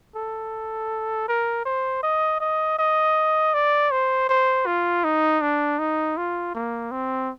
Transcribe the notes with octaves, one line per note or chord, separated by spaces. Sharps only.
A4
A#4
C5
D#5
D#5
D#5
D5
C5
C5
F4
D#4
D4
D#4
F4
A#3
C4